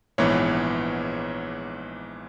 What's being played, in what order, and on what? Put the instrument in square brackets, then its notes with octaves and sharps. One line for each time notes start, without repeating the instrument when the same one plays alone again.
[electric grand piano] A#1 G#2 E3 B3 C#5